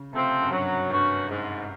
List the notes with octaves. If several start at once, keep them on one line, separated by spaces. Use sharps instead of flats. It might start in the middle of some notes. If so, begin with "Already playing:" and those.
Already playing: C#3
C3 F3 A3 C4
F#2
G2 F#3
G2 A3 C#4 F#4 B4
G#2